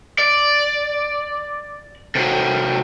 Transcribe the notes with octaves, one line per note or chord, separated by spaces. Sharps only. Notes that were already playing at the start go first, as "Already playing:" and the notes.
D5
C3 F#3